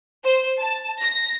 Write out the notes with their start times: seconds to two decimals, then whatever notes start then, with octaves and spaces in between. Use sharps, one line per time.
0.24 C5
0.59 A5
1.00 A#6